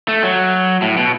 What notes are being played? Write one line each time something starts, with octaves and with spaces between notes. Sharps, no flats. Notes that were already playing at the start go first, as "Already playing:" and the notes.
A3
F#3
A2
B2